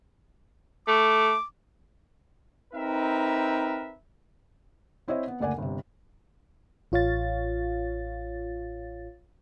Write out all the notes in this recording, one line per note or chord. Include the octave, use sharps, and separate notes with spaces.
A3 D6
C4 D#4 A#4 B4 E5
C4 E4 C5 C#5 D#5 E5
B3
F#1 D2 A#4 D5 F#5 G#5
G1 C3
A1 F4 C#5 F5 A6